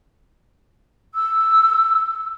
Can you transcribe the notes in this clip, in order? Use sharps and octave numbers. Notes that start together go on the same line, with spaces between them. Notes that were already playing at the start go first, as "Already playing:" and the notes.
E6